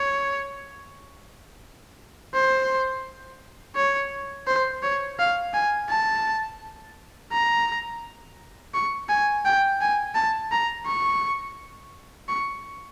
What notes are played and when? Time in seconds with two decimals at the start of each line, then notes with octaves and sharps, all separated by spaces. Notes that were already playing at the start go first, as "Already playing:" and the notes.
Already playing: C#5
2.35 C5
3.76 C#5
4.47 C5
4.83 C#5
5.19 F5
5.54 G#5
5.90 A5
7.32 A#5
8.75 C#6
9.09 G#5
9.45 G5
9.81 G#5
10.15 A5
10.52 A#5
10.86 C#6
12.29 C#6